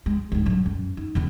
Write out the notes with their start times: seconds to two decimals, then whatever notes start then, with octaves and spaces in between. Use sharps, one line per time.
0.06 G#3
0.32 D2 G#2
0.46 D3 F#3
0.66 F#2
0.97 D#4
1.15 E2 C#3